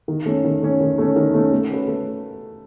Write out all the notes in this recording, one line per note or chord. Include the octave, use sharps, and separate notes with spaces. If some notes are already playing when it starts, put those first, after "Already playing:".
D#3
A3 C#4
D#3
A3 C#4
D#3
A3 C#4
D#3
A3 C#4
A3
C#4 F#4 B4
A3